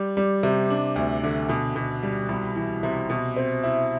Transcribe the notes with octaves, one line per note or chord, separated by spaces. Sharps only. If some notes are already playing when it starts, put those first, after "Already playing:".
Already playing: G3
G3
C3
D4
D2
D3
B2
B2
G3
C2
E3
C3
B2
C4
E4